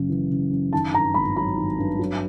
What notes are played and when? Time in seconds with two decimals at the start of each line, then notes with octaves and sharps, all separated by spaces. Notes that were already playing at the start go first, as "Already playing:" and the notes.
Already playing: F#1 F#2 C#3
0.09 E3
0.31 C#3
0.51 F#2
0.73 D#3 A5
0.93 G2 A#5
1.14 G#1 B5
1.36 F#3 B5
1.57 D#3
1.78 G2
1.99 F#3